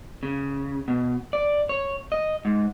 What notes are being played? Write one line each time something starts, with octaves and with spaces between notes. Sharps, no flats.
C#3
B2
D5
C#5
D#5
G#2